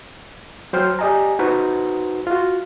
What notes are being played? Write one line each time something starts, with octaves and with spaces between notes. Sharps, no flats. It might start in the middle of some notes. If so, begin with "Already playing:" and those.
F#3 C5 G5 F6
G4 D5 D#5 G#5 A#5
D#4 F#4 B4 C5 F#5 A#5
F4 F#4